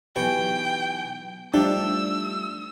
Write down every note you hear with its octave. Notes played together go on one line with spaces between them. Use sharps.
B1 E3 G4 B4 G5 G#5 C#6
F3 G3 A3 D4 D#4 G4 E6